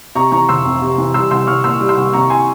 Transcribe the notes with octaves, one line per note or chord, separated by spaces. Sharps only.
C3 A#5 C#6
E3 A#5 C#6
F1 C6 E6
F2
C3
E3
G3 C6 E6
C2 C6 E6
C2 C#6 F6
A#2 C6 E6
G3
C6 E6
C2
C3 A#5 C#6
G#5 C6